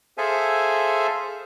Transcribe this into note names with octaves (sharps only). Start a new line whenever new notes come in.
G#4 A4 C5 E5 F5 G#5